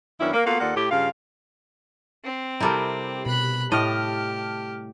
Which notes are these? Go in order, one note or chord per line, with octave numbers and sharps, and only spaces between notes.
F#2 D#3 B3 C#4 D4 E4
A#3
A#3 B3 F4 F#4 A4 F5
D#2 A#3 F4 A4 D5 F#5
A2 G4
G2 C#3 F4 F5
C4
C3 G3 E4 A4 A#4
B2 B5 F#6
A2 G4 D#5 A5 F6